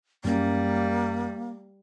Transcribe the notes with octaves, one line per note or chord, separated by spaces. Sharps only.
F#2 G3 A#3 C#4